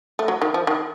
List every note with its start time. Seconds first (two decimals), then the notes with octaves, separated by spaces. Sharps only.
0.19 A3
0.28 F#3
0.42 D#3
0.54 F3
0.67 D#3